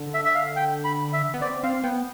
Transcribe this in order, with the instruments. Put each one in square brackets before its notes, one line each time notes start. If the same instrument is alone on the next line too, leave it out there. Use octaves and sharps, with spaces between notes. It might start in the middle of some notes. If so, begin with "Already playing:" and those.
Already playing: [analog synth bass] D3
[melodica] E5
E5
F5
G5
B5
E5
[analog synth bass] B3
[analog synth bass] C4 [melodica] D5
[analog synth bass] C4 [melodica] F5
[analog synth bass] B3 [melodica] G5